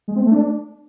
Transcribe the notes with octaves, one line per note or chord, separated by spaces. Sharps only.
G#3
C4
A3
D4